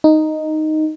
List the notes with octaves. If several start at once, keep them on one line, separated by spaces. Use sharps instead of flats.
D#4